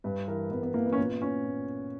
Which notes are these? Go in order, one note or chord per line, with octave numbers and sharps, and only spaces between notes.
G2 B4
E3 A#4
G2 B3
B3
E3 A#3
B3
C#4
A#2 B3
C#4
A#2